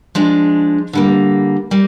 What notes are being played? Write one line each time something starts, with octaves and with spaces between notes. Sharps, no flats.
F3 G#3 D4
D3 G3 A#3
G3 A#3